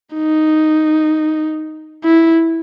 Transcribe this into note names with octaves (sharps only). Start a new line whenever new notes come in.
D#4
E4